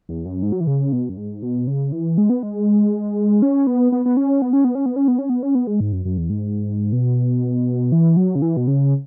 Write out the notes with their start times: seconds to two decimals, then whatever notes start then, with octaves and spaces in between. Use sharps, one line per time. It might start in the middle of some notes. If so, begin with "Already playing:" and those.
0.09 E2
0.25 F#2
0.43 G#2
0.52 F#3
0.60 E3
0.67 C#3
0.92 B2
1.09 F#2
1.17 G#2
1.42 B2
1.67 C#3
1.92 E3
2.18 G#3
2.30 B3
2.43 G#3
3.42 C#4
3.67 B3
3.92 B3
4.06 B3
4.17 C#4
4.42 B3
4.53 C#4
4.64 B3
4.75 C#4
4.86 B3
4.96 C#4
5.08 B3
5.19 C#4
5.30 B3
5.43 C#4
5.55 B3
5.67 G#3
5.80 G#2
5.92 F#2
6.05 F#2
6.18 E2
6.30 G#2
6.92 B2
7.92 E3
8.17 F#3
8.35 C#3
8.42 E3
8.57 B2
8.67 C#3